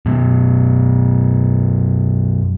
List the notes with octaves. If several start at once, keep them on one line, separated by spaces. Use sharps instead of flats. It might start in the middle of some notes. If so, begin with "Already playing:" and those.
F#2 B2